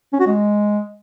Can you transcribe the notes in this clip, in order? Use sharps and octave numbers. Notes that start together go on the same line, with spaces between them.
C#4
F#4
G#3